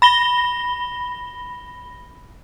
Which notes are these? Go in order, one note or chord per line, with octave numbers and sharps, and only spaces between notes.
B5 A#6 G7